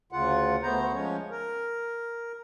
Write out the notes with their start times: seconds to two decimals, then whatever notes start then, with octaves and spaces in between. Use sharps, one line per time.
0.12 D2 C#3 F4 F#5
0.63 D2 A3 B3 C5 A#5
0.93 F3 G#3 C#4 C#5
1.31 A#4